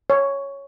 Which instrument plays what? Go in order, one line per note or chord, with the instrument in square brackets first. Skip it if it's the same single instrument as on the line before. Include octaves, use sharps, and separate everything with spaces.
[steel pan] C#5